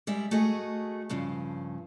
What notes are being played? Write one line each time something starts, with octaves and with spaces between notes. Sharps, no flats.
G3 G#3 D5 E5
A3 F#4 G#4 D#5
G2 C#3 F3